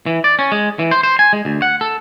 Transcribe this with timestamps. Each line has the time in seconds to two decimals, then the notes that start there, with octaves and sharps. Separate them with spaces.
0.06 E3
0.24 D5
0.39 C#4
0.52 G#3
0.79 E3
0.91 C5
1.03 C5
1.19 G#5
1.33 G#3
1.45 D2
1.62 F#5
1.81 A4